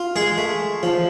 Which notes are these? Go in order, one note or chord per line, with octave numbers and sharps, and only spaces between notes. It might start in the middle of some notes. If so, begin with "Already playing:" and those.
Already playing: F4
G#3 G#4
A3
F3